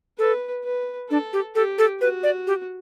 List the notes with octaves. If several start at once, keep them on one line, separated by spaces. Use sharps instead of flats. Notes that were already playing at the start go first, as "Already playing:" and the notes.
A4 B4
B4
D4 A4
G4
G4 A4
A4
F#4 B4
D5
G4